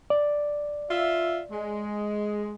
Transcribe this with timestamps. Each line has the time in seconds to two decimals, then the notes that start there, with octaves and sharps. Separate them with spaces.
0.10 D5
0.90 F4 E5
1.51 G#3